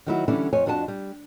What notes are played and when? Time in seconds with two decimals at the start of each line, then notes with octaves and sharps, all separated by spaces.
0.06 D#3 F#3 E4 F#4
0.28 D3 E3 G3 C#4 D4 E4
0.53 F2 C4 C#5 G#5
0.66 F2 D4 F#4 D#5 G#5 A5
0.88 G3